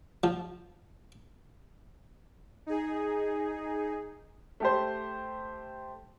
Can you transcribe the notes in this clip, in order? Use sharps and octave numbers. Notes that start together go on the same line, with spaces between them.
F3
D#4 G#4
A3 G4 C5